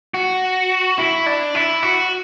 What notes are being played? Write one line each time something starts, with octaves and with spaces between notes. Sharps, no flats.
F#4
E4
D4
E4
F#4